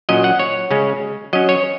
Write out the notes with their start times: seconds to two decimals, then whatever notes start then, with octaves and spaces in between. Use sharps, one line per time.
0.09 A#2 F#3 C#4 D#5
0.24 F#5
0.39 C#5
0.71 C#3 G#3 C#4
1.33 F#3 C#4 D#5
1.49 C#5